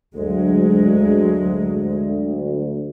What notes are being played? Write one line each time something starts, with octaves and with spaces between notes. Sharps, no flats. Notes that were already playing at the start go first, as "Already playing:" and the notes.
D2 F#3 G#3